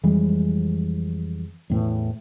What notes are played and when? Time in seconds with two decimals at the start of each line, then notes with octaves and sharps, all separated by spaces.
0.03 F2 E3 G3 G#3
1.70 E2 A2 E3